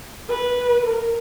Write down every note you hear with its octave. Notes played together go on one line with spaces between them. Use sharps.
B4
A#4